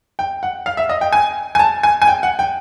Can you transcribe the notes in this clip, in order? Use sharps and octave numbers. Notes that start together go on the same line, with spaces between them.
G5
F#5
F5
E5
D#5
G5
G#5
G#5
A5
G#5
G#5
G5
F#5
G5